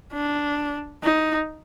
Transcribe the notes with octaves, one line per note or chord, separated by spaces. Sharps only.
D4
D#4